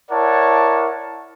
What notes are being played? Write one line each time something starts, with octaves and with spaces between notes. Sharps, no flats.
E4 A#4 C#5 D5 F#5 A5